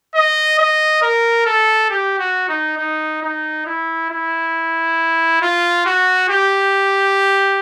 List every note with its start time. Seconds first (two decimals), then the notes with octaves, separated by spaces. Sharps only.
0.15 D#5
0.59 D#5
1.02 A#4
1.46 A4
1.90 G4
2.19 F#4
2.49 D#4
2.78 D#4
3.22 D#4
3.67 E4
4.10 E4
5.42 F4
5.86 F#4
6.29 G4